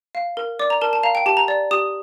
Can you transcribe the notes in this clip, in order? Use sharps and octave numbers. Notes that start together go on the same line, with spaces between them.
F5
A#4
D5 D6
A#5
A#4 A5
A5
F5 A#5
G5
G4 A5
A#5
D5
G4 D#6